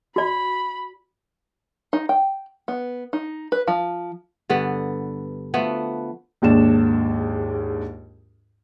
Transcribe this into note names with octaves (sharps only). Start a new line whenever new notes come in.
F#4 D5 B5
D#4
G5
B3
D#4
B4
F3
G2 D3 B3
F3 A3 B3 F#4
A#1 D#2 G#2 D4 E7